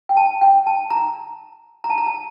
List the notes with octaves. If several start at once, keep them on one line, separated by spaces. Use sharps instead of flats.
G5
A5
G5
A5
A#5
A#5
A5
A#5
A5